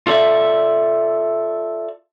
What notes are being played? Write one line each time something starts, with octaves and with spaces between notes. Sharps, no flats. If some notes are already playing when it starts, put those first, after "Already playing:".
F4 A4 D5 E5